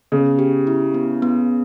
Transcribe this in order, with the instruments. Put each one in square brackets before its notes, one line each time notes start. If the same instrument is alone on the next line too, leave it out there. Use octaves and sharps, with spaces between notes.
[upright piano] C#3 [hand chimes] B3
[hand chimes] G4
E4
B3
B3